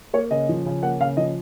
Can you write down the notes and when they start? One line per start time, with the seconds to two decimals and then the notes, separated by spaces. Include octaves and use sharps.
0.14 A#3 C#5
0.31 C#3 D#5
0.49 F3
0.66 C#3
0.83 A#3 F#5
1.01 C#3 F5
1.17 F3 D#5